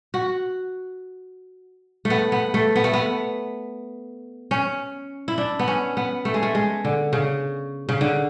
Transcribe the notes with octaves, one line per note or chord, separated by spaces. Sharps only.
F#4
A3
B3
B3
A3
B3
A3
B3
C#4
E4
D4
B3
C#4
B3
A3
G#3
A3
G#3
D3
C#3
C#3
D3